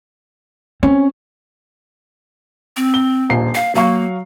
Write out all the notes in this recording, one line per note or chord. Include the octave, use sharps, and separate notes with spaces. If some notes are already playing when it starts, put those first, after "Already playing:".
C4 C#4
C4
G7
D#1 A#1 C7
F5 C7
F#3 A#3 F5 C#6